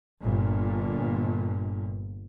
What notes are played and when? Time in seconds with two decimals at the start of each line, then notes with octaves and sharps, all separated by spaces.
0.22 G1 A#2